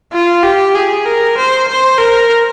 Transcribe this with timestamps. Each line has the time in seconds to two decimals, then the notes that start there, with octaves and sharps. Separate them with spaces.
0.12 F4
0.43 G4
0.75 G#4
1.06 A#4
1.37 C5
1.68 C5
1.98 A#4